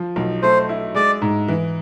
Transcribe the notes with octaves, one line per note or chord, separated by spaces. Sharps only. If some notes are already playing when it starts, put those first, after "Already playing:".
Already playing: F3
B1
A3 C5
E4
G#3 D5
G#2
E3